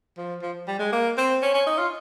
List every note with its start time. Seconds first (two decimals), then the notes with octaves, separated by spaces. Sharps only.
0.17 F3
0.42 F3
0.68 G3
0.79 G#3
0.92 A#3
1.17 C4
1.42 C#4
1.54 C#4
1.67 D#4
1.78 F4